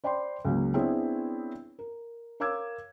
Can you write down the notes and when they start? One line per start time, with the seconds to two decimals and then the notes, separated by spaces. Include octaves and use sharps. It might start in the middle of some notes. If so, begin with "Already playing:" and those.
0.04 C5 D5 G5 B5 C6
0.45 C#2 F#3 A#3
0.74 B3 C4 D4 E4 G#4 C#5
1.79 A#4
2.40 A#4 C#5 F5 D6 E6 G#6